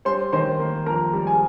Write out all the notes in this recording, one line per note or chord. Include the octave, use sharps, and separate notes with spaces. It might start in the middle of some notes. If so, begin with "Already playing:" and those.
G3 C5 C6
D#3 C5 C6
A#3
F2 A#4 A#5
G3
G#4 G#5